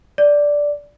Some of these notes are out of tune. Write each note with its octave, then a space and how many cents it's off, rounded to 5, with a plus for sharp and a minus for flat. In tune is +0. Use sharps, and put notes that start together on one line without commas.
D5 -5